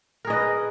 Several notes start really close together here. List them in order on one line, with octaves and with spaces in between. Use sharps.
A#4 G#4 D#5 B4